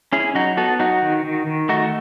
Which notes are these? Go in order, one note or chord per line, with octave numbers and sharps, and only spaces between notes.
C#4 E4 G#4
F#3 D#4 F#4
B3 F#4 A4
F#3 D#4 F#4
D#3
D#3
D#3
A3 D#4 F#4